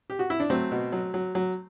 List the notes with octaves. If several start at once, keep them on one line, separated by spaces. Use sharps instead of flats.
G4
F#4
E4
D4
F#3 A3 C4
B2
F#3
F#3
F#3